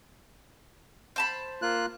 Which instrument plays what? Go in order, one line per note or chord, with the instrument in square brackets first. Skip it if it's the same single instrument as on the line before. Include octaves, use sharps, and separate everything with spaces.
[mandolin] C5 A5 B5
[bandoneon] A#3 F4 F#6